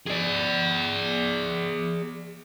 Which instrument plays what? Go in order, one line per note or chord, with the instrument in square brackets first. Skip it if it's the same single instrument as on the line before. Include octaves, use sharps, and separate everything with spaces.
[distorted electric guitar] G#4 D5